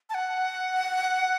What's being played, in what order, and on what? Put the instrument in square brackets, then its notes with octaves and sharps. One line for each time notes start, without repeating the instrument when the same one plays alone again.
[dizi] A5
F#5